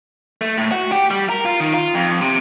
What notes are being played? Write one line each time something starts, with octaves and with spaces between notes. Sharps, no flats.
A3
A2
F#4
G4
G3
A#4
F4
D#3
F4
F2
C3